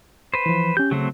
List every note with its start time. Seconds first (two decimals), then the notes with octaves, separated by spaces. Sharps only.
0.34 B4 C5
0.46 E3 F3
0.77 C#4 G4 G6
0.91 C#3 F#3 A3 C4